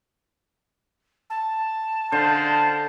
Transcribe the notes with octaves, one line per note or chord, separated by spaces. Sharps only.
A5
D3 G#3 F4 C5